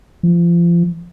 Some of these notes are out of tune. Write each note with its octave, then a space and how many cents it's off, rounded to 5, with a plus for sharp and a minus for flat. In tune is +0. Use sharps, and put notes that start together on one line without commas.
F3 -30